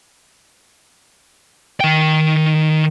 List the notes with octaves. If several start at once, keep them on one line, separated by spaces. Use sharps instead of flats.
D#3 G5